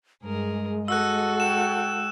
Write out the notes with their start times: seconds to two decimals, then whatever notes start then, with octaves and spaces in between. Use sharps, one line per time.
0.23 G2 G#3 G#4 A#4
0.88 F#4 A4 D#5 E6 F#6
1.40 G5 E7